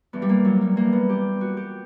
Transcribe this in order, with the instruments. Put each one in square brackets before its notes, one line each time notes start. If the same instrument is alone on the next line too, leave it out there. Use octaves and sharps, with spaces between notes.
[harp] G2 E3 B3
G3
A#3
F#3
G3
G2 E3 A#3
B3
G4
A#2 F#4
G4